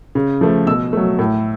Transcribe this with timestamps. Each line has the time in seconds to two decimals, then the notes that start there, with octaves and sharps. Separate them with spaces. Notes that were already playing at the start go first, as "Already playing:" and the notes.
0.15 C#3
0.41 F3 A3
0.67 B2 E6
0.93 F#3 A3
1.19 A2